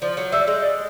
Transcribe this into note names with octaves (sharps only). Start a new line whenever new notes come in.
F3 D5
F#3
G3 E5
G#3
D5